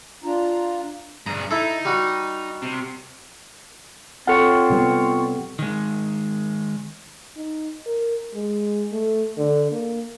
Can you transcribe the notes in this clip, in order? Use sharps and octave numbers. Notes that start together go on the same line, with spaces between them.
D4 F4 A#5
G2 G#4 A#5
D#4 E4 A4
G3 F#4
C3
C4 F4 A4 C#5 F#5
C3 G3 B3
D#3 G#3
D#4
A#4
G#3
A3
D3
A#3